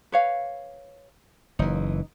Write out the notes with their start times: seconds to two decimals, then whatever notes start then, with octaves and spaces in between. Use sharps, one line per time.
0.12 B4 C#5 F5
1.59 F#1 E3 D#4